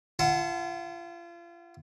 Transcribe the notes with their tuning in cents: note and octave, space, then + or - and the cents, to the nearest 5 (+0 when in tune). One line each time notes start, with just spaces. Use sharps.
F4 -35 F#5 +0 A5 +0